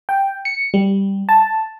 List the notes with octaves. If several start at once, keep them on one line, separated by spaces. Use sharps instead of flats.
G5
C#7
G3
A5